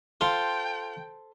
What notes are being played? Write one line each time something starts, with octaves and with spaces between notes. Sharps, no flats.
F4 A4 C5 G5